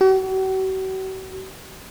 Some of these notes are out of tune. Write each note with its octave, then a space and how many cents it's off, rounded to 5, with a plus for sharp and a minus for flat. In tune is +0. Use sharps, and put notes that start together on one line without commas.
F#4 +45